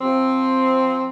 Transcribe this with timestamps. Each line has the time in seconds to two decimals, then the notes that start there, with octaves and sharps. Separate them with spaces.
0.01 F3 C4